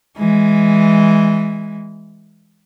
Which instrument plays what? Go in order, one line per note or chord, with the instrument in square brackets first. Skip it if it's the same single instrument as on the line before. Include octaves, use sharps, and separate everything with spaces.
[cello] E3 G#3